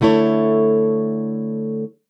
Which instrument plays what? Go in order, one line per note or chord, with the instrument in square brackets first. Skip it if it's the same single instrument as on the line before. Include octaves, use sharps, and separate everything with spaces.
[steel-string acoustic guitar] D3 A3 E4 A4 C#5